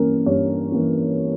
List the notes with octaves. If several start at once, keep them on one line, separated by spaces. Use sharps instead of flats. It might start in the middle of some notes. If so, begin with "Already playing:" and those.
Already playing: G2 E3 A#3 C#4 A#4
G2 C#5
E3 A#3 C#4